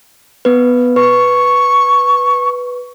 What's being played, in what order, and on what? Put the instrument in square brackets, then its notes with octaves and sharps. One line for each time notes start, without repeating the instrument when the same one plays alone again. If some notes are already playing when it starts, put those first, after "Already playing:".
[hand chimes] B3 B4
[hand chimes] B4 [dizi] C#6